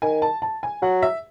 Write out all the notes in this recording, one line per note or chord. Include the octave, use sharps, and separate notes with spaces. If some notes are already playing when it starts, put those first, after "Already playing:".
D#3 G#5
A5
A5
G#5
F#3 F#5
E5